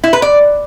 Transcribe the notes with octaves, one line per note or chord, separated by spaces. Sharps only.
E4
B4
D5